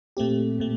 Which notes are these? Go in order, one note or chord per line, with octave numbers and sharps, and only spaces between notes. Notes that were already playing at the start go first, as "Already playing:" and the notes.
A#2 A3 C4 G4
A#2 A3